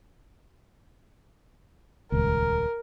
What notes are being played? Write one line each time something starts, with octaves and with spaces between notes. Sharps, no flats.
D#1 C#2 A#4